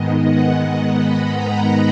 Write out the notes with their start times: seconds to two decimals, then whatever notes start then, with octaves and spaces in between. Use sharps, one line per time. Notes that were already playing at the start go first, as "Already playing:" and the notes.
Already playing: G#2 D#3 G#3 B3 D#5
0.26 F#5
0.99 B5
1.35 A#5